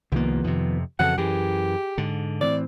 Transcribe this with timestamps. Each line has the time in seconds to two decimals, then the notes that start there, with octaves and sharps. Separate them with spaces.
0.12 C2 D#3 F3 A#3 B3
0.44 F2 C3
0.99 F2 C#3 E3 F#4 A4 F#5
1.18 F#2 E3 G4 G#4
1.98 G#2 D3
2.41 A2 E3 C4 D5